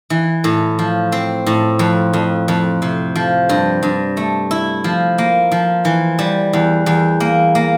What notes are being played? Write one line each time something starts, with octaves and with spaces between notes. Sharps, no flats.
E3
A2
F3
C4
A2
F2
F2
F2
C3
F3
G2
G2
A3
E4
F3
A#3
F3
E3
G3
E2
E2
A#3
A#3